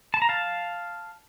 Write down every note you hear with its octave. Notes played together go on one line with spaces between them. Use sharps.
A5
A#5
F5 A5